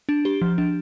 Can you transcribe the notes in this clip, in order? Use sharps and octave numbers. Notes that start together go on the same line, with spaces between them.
D4
G4
F3
D4